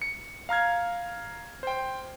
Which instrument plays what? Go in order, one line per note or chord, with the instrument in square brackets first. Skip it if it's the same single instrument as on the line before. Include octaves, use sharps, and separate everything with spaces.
[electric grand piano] C#7
F5 A#5 F6 G#6
C5 G5